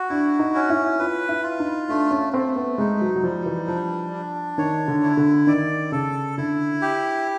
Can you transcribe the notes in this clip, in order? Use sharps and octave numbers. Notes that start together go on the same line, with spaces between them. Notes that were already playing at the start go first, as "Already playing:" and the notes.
Already playing: F#4
D4 E4
D#4
C#4
E4
F4 B4
E4
F4
D#4
A3 D4
C#4
A3 C4
B3
G#3 D#4
F#3
F#3
F3 G3
E3
F3 D4
D4
D#3 C#5
D3
E4
D3
D#3 D5
C#3 A4
D3 E4
G4